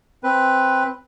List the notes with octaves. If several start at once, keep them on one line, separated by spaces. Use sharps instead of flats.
C4 B4